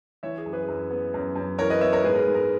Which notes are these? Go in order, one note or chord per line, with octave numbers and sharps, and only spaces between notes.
E3 C#5 E5
G#4
F#2
G#4 B4
F#2
B3
F#2
F#2
E3 A#4 C#5
B4 D#5
B3 C#5 E5
A#4 C#5
G#2 G#4 B4
A#4
G#4
G#2
A#4